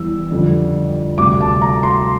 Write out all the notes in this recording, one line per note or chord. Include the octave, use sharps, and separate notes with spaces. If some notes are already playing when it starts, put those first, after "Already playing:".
Already playing: E2 E3 G3 E6
F2 D3 G3
D2 C3 G3 D6
A5
A#5
C6